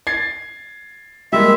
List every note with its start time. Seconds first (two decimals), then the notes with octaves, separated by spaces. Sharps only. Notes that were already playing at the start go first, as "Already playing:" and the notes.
0.07 G#6 A6 C7
1.33 G3 G#3 A#3 E5